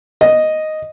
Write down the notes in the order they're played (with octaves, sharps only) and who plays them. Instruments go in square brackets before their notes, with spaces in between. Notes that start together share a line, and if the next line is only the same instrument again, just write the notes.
[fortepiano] D#5